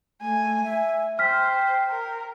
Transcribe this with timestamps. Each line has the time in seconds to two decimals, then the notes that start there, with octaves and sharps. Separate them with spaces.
0.21 A3 G#5
0.63 E5
1.19 C5 G5 F6 B6
1.90 A#4